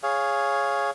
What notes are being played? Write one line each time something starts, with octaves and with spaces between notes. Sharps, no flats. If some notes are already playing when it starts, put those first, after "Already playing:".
G#4 C#5 F5